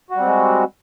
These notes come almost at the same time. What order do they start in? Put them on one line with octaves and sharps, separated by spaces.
F#4 G3 C4 G#3